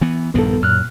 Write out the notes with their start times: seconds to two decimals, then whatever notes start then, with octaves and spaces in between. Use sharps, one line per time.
0.01 E3 B3
0.34 A#1 G2 D#3 B3 A4
0.62 F#2 A#2 F6 F#6